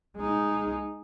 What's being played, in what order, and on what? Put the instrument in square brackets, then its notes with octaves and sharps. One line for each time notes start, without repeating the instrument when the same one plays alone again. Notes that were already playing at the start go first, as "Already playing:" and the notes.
[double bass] G#3 D#4